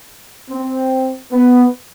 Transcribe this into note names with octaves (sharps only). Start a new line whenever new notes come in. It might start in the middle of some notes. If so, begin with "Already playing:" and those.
C4
B3